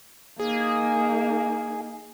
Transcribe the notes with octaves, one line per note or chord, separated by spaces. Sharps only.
A#3 D#4 G#4